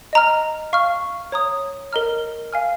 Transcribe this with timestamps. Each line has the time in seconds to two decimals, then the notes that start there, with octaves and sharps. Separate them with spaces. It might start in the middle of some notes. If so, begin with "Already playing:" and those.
0.13 D#5 A#5 F6
0.73 F5 C#6 F6
1.32 C#5 A#5 D#6
1.93 A#4 D#5 A#5 F6
2.53 F5 G#5 F6